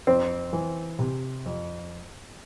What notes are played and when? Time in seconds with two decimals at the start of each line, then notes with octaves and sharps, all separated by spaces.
0.07 F2 C4
0.53 E3
0.99 C3
1.46 F2